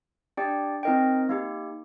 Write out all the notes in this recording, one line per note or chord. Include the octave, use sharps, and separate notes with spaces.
D4 G4 D5 G5
C4 D#4 A#4 D#5 G5
A#3 D#4 G4